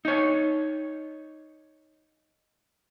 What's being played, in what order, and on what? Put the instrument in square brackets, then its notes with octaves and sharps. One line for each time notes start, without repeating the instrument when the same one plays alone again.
[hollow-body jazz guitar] D#4 C#5